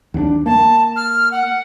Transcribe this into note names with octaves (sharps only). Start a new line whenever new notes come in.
D#2 C4 D4
A#3 A5
F6
F#5